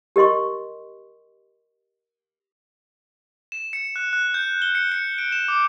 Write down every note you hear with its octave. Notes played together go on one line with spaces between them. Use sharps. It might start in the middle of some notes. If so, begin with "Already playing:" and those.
G4 A#4 D#5 C6 C#6
E7
C#7
F#6
F#6
G6
G7
C#7
C#7
D7
E7
D6